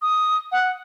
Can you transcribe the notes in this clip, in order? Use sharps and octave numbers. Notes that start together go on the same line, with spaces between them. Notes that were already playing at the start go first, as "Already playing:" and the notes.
D#6
F#5